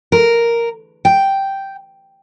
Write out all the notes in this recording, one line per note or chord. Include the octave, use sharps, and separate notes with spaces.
A#4
G5